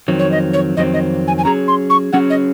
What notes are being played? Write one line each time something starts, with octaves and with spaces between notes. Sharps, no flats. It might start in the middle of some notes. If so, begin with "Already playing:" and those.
F2 D#3 F#3 C4
C#5
D#5
C#5
F2 D#3 F#3 C4 D#5
D#5
G#5
G#5
F#3 C#4 G#4 A#5
C6
C#6
F#3 C#4 G#4 F#5
D#5